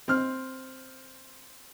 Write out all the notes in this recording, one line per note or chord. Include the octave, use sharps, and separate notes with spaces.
C4 F6